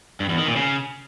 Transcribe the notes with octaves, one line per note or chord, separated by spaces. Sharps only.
G2
E2
D#3
A#2
C#3